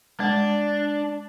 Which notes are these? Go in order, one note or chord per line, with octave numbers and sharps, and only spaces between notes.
G#3 D4